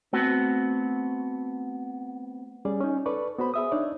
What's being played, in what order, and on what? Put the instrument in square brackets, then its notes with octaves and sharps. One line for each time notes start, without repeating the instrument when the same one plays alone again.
[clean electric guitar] A3 B3 C4 F#4
[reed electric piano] G3 C#4 G#4 D5
C#4 D#4
A4 B4 D5 C#6
B3 F#4 C5 B5
G#4 E5 D#6
D4 D#4 C#5 D5